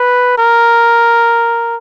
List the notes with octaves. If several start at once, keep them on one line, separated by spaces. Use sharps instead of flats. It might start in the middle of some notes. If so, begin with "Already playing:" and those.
Already playing: B4
A#4